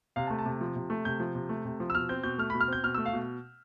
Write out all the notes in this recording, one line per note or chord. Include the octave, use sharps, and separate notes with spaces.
C3 F5
A5
A3
A5
C3
F3
C3
A3
C3 G6
F3
C3
A3
C3
F3
E6
B2 F6
C4 G6
B2 G6
A3 F6
B2 B5
F6
C4 G6
B2 F6
A3 E6
F5
B2